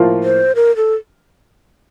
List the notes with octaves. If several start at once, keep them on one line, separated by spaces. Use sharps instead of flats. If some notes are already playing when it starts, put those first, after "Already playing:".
Already playing: A2 F3 A#3 F4
C5
A#4
A4